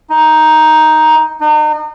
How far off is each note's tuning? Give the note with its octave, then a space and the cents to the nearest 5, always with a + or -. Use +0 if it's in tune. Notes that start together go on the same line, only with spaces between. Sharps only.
D#4 +5
D#4 -40